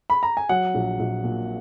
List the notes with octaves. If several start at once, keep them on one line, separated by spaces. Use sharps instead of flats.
B5
A#5
G#5
F#3 F#5
A#1
A#1
A#2